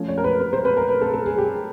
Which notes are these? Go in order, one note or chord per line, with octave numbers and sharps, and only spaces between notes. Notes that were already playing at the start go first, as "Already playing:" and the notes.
Already playing: F3 A3 C#4
C#5
A#4
B4
B4
C5
B4
A#4
B4
A4
A4
G#4
G4